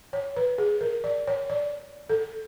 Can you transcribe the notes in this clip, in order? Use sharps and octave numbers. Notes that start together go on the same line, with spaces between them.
C#5
B4
G#4
A#4
D5
C#5
D5
A4